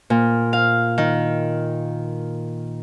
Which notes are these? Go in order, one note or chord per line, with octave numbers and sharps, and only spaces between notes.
A#2
F5
D#3